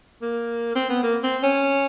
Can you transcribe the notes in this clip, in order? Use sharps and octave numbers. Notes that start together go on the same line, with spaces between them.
A#3
C4
B3
A#3
C4
C#4